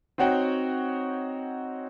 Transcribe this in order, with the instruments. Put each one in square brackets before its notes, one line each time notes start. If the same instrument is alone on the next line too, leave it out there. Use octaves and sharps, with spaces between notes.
[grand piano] C4 D#4 F#4 C#5 F#5 G5